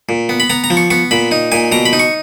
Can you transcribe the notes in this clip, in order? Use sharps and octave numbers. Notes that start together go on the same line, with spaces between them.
A#2
B3
B5
B3 A#5
A#5
F3
C#6
B3 C#6
A#2 B5
D#4
A#2 G#5
B2 A#5
B5
D#4
C#6